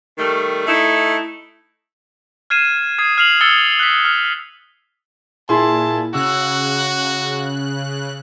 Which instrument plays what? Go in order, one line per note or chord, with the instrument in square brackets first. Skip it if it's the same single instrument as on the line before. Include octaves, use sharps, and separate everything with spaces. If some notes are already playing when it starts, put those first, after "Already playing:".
[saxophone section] D#3 G3 A3
A3 D#4 E4
[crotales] F6 G#6 C7 D#7 E7
D#6 G#6 C7
F6 C7 F7 F#7
D#6 E6 A6 C#7 G7
F#6 B6
F6
[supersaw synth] A#2 [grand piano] E4 G#4 C6 [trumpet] A5
[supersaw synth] C#3 F#6 [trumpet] F#4 [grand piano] E6